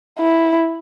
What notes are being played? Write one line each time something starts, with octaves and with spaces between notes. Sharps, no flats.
E4